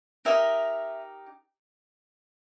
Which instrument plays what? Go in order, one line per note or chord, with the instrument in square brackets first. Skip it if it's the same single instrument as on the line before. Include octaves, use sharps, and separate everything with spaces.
[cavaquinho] D#4 G4 A#4 D#5 E5